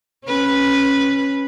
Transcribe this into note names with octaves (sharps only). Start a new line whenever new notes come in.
C#4 B4